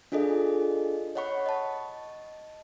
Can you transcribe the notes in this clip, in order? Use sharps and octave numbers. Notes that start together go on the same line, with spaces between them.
D4 F4 G#4 A4 D#5
C#5 D#5 F#5 B5 C#6
D#5 A5